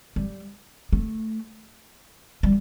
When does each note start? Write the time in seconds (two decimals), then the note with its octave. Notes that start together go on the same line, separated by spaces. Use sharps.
0.16 G3
0.93 A3
2.43 G3